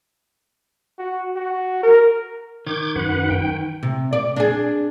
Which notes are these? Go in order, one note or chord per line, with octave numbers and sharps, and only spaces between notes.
F#4
F#4
A#4
D#3 D6 G6 G#6
F#2 B4 F#5
G5
C3
D5
D4 G#4